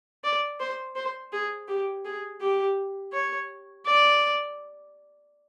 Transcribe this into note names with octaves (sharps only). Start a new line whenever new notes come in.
D5
C5
C5
G#4
G4
G#4
G4
C#5
D5